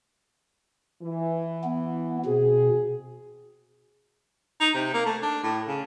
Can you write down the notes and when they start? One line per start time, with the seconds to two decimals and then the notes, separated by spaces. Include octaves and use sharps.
1.02 E3
1.64 B3
2.26 B2 C4 G#4
4.61 D#4
4.74 C3
4.93 A#3
5.06 A3
5.22 D4
5.44 A2
5.68 C#3